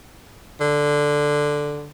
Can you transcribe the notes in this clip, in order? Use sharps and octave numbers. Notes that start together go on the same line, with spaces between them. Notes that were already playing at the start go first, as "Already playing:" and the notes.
D3